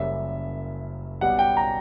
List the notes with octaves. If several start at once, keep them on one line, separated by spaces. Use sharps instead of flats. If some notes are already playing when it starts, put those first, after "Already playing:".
Already playing: F#1 F#2 C#3 G3 E5
B1 B2 G3 B3 F#5
G5
A#5